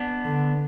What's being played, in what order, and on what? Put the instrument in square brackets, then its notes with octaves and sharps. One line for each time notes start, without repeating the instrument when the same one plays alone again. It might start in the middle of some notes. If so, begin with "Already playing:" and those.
Already playing: [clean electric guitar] B3 D4
[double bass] D3